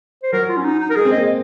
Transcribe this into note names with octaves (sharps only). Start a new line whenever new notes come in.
C5
F#3 A#4
F4
C#4
D#4
D#4
A#4
G#3 G#4
C4
A#3 D#5